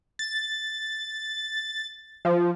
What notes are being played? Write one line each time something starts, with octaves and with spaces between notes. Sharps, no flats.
A6
F3